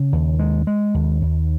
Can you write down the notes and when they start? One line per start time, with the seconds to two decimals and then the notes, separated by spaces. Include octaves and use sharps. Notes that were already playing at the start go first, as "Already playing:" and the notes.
Already playing: C#3
0.13 D#2
0.39 G#3
0.67 G#3
0.94 D#2
1.22 D#2